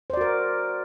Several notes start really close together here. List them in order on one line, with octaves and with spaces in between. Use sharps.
C5 D5 F#4 A#4